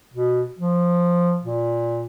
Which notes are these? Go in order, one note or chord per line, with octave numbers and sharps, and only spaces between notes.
B2
F3
A#2